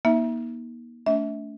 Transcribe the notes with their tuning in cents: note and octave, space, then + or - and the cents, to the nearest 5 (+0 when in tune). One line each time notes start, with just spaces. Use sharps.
A#3 +40 D#4 +25 E5 +0
A3 +0 D4 -45 E5 -30